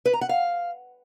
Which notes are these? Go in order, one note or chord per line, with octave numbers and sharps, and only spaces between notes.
B4
A#5
F#5
F5